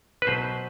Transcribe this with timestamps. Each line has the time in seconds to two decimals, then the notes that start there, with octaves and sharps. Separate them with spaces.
0.22 B4
0.27 B2 F#3 C5